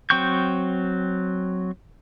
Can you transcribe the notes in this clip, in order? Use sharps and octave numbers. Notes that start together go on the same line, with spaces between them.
F#3 C4 G5 C#6 G6